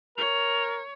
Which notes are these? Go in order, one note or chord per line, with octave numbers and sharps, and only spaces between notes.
A#4 C#5 F7